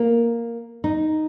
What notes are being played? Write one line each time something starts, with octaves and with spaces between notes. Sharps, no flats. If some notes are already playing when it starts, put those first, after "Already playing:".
Already playing: A#3
D#4